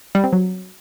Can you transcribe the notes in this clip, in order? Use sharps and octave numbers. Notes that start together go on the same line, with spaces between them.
G3
C4
F#3